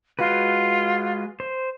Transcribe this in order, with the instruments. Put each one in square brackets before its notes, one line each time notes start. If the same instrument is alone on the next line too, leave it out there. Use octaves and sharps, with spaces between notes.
[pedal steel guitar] G#3 F#4 B4 [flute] F4
[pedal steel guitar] C5